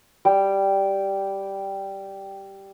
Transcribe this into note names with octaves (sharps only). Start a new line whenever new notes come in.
G3 G5